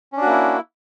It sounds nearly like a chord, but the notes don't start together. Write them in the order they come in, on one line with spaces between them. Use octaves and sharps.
C#4 D4 F#4 A#3 E4